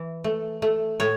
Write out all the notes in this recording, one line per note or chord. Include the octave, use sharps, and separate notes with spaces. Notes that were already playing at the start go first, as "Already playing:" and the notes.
Already playing: E3
A3
A3
A2 C#5